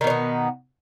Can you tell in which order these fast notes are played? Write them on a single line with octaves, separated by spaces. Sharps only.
D#3 B2 C#4 B3